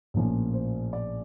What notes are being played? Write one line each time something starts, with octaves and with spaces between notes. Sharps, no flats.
A#1 A2 F3 A#3 C#4
C5
D5